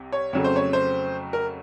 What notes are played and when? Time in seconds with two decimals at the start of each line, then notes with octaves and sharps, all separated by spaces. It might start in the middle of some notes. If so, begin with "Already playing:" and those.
Already playing: C2 C3
0.12 C#5
0.33 F2 C#3 F#3 A3 C#5
0.44 C5
0.56 C#5
0.73 C5
1.33 A#4